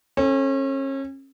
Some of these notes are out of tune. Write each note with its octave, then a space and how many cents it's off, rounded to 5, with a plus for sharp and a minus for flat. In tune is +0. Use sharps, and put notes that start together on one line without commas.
C#4 -35 A4 +0